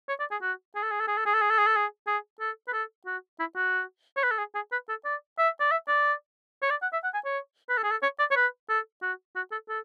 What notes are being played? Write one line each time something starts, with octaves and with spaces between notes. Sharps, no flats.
C#5
D5
G#4
F#4
G#4
A4
G#4
A4
G#4
A4
G#4
A4
G#4
A4
G#4
A4
G#4
G#4
A4
B4
A4
F#4
E4
F#4
C#5
B4
A4
G#4
G#4
B4
A4
D5
E5
D5
E5
D5
C#5
D5
F#5
E5
F#5
G#5
C#5
B4
A4
G#4
A4
C#5
D5
C#5
B4
A4
F#4
F#4
A4
A4